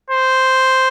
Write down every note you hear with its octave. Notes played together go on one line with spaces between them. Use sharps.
C5